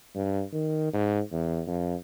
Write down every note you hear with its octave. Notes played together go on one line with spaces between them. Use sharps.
G2
D#3
G#2
E2
F2